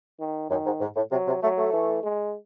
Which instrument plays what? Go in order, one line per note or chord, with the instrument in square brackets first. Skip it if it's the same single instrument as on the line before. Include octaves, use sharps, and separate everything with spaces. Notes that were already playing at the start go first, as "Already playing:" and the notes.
[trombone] D#3
[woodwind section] F#2 [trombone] D#3
[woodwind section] G#2
G#2
A2
[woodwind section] C3 [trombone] F#3
[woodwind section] C3
[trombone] F#3 [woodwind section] A3
[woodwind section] A3
[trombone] E3
G#3